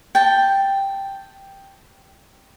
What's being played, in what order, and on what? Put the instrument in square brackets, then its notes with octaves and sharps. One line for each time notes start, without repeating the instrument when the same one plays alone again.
[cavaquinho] G5 A5